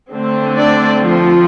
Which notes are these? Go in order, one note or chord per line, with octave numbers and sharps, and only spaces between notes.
D3 A3 C4
D4 D5
F3 F4